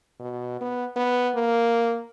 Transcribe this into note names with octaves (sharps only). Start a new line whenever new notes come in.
B2
B3
B3
A#3